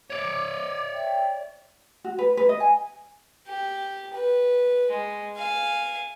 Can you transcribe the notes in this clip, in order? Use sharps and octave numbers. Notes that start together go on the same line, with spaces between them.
C#5 D5 D6
E5 G5
F#4
B4
B4
D#5
G#5
G4
B4
G#3
F5 G#5